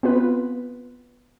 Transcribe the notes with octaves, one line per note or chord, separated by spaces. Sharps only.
B3 C4 F4 B4